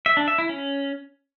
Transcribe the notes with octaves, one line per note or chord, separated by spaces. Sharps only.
E5
D4
E5
E4
C#4